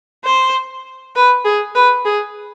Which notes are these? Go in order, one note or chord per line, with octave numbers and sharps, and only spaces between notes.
C5
B4
G#4
B4
G#4